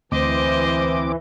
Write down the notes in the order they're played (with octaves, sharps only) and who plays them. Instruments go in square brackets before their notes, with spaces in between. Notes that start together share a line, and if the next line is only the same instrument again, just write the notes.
[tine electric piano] D2 [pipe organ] E3 [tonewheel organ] C4 D6 [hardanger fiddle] C5 D#5